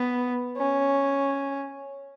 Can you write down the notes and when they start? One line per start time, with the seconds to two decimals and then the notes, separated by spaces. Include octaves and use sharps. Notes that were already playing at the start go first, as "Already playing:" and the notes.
Already playing: B3
0.57 C#4